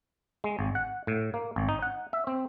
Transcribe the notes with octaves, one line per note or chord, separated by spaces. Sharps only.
G#3
G#1
F#5
A2
A#3
G#1
D#4
F#5
E5
C4